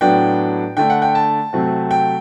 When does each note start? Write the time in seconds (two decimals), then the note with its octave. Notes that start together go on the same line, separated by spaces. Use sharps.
0.01 A2 F#3 B3 D4 G5
0.77 D3 A3 D4 G5
0.90 F#5
1.02 G5
1.15 A5
1.53 C3 F#3 A3 C4
1.91 G5